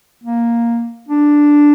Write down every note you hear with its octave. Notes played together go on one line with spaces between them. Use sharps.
A#3
D4